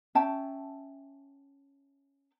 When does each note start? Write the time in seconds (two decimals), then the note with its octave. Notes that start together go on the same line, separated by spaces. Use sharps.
0.15 C#4 E5 G5 A5